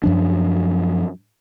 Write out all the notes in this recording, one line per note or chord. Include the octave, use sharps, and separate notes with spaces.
F#2 F3 D4